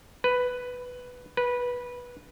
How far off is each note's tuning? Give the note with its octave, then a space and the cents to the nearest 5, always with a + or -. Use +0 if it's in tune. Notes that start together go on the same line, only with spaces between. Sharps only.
B4 +5
B4 -15